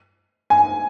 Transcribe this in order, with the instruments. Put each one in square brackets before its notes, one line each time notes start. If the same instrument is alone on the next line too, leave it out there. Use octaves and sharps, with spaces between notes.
[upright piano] G#5